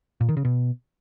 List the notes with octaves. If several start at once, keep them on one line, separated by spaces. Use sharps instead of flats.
A#2
D#3
C#3
B2